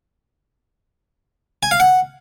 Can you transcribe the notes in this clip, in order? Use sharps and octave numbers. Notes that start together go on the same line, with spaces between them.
G#5
F5
F#5